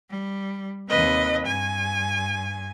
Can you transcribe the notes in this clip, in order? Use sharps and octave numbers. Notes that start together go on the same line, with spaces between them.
G3
D#2 C3 B4 D#5
G2 G#5